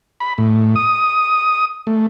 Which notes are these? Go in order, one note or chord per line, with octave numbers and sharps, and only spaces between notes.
B5
A2
D#6
A3